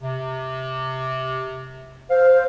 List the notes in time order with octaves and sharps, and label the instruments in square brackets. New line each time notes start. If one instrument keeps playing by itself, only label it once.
[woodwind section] C3
[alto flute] C5 [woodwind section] F5